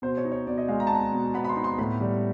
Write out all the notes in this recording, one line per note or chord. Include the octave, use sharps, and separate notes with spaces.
B2 C5
C#5
D#4
C#5
B2 D5
D#5
G#3 F5
A#5
A5
B3 A#5
B2
B3 B5
B5
C6
D#4
C6
A2 B5
G3